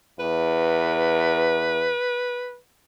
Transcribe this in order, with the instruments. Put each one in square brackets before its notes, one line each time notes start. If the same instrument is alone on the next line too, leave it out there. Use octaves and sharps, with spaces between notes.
[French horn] E2 [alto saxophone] B4